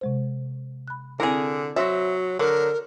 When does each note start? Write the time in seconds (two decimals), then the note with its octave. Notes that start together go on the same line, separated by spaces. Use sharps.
0.01 C3 G#3 C5
0.88 B5 F#6
1.20 D3 C4 E4 G#4 A#4
1.76 F#3 F#4 C5 E5
2.39 D3 F#3 A#4